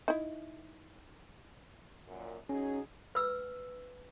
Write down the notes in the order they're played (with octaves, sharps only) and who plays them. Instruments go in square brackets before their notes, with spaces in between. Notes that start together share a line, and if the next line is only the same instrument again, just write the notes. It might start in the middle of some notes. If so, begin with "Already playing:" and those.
[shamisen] D#4 E4
[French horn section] F#2 A#2
[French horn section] F#3 D#4 G#4 [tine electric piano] C#4
[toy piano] B4 E6